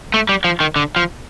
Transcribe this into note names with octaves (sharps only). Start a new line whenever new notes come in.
A3
G3
F3
D#3
D3
F3